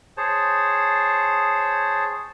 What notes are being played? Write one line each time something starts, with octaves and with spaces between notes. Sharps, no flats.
G#4 C5 C#5 A5